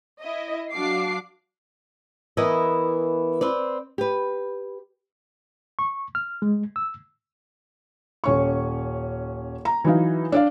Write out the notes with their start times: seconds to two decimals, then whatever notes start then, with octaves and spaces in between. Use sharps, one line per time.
0.21 E4 D#5
0.73 F#3 D4 F#4 F5 D6 C7
2.37 E3 B3 E4 A#4 B4 D#5
3.41 C4 B4 D5
3.98 G4 B4
5.79 C#6
6.15 F6
6.42 G#3
6.76 E6
8.24 D#1 C#4 C#6
9.65 A#5
9.84 E3 F#3 D#4 F5
10.32 D4 D5 F5